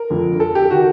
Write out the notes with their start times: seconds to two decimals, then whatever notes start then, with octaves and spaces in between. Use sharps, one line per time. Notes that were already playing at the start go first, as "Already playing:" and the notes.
Already playing: A#4
0.10 F2 D3 F3
0.40 A4
0.55 G4
0.71 D#3 F#4